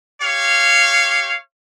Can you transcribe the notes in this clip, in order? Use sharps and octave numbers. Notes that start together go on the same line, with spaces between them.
G4 C#5 F5